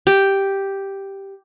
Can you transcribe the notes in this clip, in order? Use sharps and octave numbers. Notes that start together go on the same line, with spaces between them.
G4